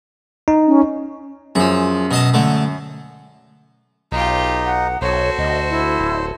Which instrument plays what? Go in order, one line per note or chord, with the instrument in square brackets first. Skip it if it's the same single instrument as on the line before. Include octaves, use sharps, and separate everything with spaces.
[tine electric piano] D#4
[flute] C#4
[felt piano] F#2 [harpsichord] F3 G#4
[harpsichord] B2 D#5 A5
D3 A3
[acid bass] B1 [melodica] D#4 [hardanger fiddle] F4 G4
[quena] F#5
[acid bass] B1 [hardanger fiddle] F#4 A4 [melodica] C5 [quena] C#5
[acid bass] D2 [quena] D#5
[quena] E4
[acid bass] D1